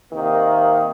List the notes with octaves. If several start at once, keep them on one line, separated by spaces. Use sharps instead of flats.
C3 D#3 A#3